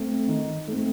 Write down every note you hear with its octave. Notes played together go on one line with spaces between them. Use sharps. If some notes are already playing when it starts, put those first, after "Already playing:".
Already playing: A3 C4
D#3
A3 C4